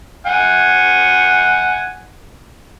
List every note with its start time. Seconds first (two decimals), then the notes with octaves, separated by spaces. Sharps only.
0.26 F#5 G#5